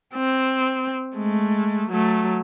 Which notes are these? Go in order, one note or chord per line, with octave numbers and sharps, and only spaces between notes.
C4
G#3 A3
F#3 A3